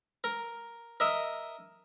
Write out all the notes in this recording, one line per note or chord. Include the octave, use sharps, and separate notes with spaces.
A#4
A#4 D#5 E5